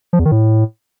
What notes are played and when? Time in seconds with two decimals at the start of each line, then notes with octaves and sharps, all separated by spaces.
0.13 F3
0.19 E2
0.25 D#3
0.32 A2